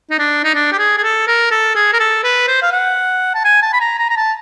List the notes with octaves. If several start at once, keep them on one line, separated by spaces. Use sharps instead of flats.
D#4
D4
D#4
D4
G4
G#4
G#4
A4
A#4
A4
G#4
A#4
A4
B4
C5
F5
F#5
A5
G#5
A5
B5
A#5
A#5
A#5
A5